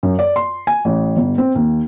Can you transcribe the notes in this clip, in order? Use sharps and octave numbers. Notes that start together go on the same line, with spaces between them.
F#2
D5
C6
G#5
A1
G1
C4
D#2